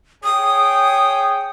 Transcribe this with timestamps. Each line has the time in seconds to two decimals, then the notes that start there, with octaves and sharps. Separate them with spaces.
0.24 G#4 C#5 G5 D#6